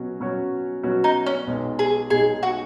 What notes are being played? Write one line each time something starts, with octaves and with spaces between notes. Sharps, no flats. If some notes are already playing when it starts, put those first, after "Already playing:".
Already playing: B2 F#3 C#4 F#4
B2 F#3 C#4 F#4 C#5
B2 F#3 C#4 F#4 C#5
D#4
C#4
B1 B2 G#3 D#4
G#4
B1 B2 G#3 D#4 G#4
F#4